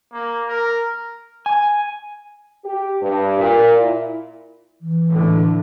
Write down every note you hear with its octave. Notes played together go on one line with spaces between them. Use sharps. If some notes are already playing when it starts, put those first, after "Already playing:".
A#3
A#4
G#5
G4
G2
A#2
E4
E3
A2 D3